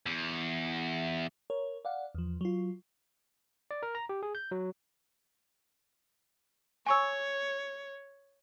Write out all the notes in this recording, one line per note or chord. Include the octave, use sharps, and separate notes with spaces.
E2
A#4 C#5
D5 F5 F#5
E2 F3
F#3 F4
D5
A#4
A#5
G4
G#4
G6
F#3
C#5 G#5 C#6 E6